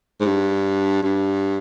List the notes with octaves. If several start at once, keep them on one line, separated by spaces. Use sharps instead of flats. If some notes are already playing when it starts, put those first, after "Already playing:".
G#2
G2
G2